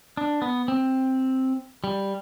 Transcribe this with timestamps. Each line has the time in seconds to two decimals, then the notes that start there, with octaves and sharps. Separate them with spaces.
0.17 D4
0.42 B3
0.68 C4
1.84 G3